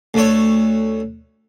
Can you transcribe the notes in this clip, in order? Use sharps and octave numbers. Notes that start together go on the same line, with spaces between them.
D2 A3 C#5